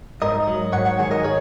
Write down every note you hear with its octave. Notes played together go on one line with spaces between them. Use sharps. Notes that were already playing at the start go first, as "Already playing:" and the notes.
G#2 A#4 D#5
F#3
G#2 C#5 F#5
C#5 F#5
D#3 G#4 C#5
A#4 D#5
G#4 C#5